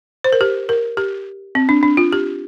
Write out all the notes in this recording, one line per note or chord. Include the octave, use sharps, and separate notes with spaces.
C5
A#4
G4
A#4
G4
C4
D4
D4
F4
G4